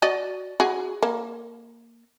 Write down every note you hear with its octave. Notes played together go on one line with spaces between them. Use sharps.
F#4 D5 D#5
F#4 G#4
A#3